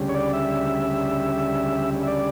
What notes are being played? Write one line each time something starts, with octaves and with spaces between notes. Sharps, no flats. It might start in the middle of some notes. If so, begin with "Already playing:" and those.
Already playing: D2 C#3 G3
C#5
D5
E5
E5
D5